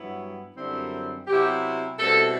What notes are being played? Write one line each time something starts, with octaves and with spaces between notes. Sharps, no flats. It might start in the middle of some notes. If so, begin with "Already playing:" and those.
Already playing: G2 F#3 B3 E4
F#2 D3 G3 C4 E4
C3 F#3 B3 E4 G4
B2 G3 C4 E4 A4